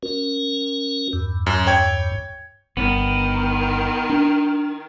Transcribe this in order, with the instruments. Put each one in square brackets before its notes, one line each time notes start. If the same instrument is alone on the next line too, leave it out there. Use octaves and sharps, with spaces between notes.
[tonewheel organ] C#4 F#4 A#4
E2 G2
[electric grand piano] F#2
C#5 G5 G#6
[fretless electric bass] G1 [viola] D#3 [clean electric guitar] B3
[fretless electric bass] D4